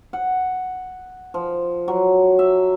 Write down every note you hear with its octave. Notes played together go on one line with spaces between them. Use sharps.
F#5
F3
F#3
E5